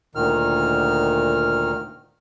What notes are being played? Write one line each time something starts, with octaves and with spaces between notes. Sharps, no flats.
D2 A#2 D#3 F6